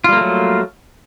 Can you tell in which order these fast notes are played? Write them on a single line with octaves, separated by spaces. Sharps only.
F4 G3 A#3 A3 F#3